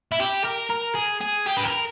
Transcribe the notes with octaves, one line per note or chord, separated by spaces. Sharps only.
E4
G4
A#4
A#4
G#4
G#4
G4
B4
A#4